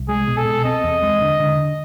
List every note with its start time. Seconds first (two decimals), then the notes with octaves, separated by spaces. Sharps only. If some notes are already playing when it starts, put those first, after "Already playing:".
Already playing: C2
0.08 G#3 G#4
0.28 B2
0.37 A4
0.46 B2
0.65 C4 D#5
0.84 E2
1.03 G#3
1.22 D3
1.40 D3